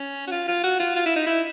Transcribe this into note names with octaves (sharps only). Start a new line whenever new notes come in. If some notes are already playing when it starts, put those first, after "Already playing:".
Already playing: C#4
F#4
F4
F4
F#4
F4
F4
E4
D#4
E4